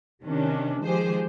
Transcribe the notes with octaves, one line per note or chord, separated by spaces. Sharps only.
C3 D#3 C#4 D4
D#3 F3 G#3 G4 G#4 C5